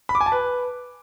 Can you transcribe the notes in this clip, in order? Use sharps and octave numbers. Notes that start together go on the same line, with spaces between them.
B5
D6
G#5
A5
B4